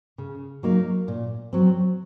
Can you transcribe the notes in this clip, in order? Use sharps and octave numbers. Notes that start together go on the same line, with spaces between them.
C#3
F#3 A#3 D#4
A#2
F#3 C4